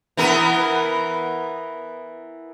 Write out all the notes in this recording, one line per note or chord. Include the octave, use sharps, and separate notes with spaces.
E3 B3 A#4